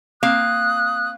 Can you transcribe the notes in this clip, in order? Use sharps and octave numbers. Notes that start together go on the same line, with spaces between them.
A#3 C4 F5 D#6 F#6